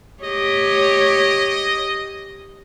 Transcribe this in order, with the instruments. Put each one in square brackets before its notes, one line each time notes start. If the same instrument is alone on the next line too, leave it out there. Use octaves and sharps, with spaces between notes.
[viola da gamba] G4 C#5 [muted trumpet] D#5